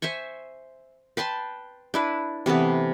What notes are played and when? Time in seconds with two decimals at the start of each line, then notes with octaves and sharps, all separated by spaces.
0.02 C5 E5 G#5 C#6
1.17 B4 G5 A5 C6
1.94 D4 E4 B4
2.46 C3 E3 A3 B3